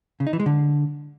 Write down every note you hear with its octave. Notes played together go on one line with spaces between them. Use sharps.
C#3
D#4
E3
G#3
D3